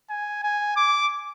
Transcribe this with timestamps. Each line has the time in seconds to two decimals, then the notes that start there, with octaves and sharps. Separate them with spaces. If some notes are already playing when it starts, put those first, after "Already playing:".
0.10 G#5
0.43 G#5
0.77 D6